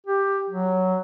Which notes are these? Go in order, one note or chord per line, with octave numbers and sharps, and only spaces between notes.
G4
F#3